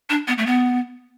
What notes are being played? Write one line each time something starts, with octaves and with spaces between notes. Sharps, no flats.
D4
B3
A3
B3